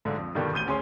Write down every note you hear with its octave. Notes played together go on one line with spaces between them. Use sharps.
B1 G#2 D3
F2
G2 B2 D3 D#3 G3
A1 D2 G6 D#7 G7
D2 C#4 G#4 C6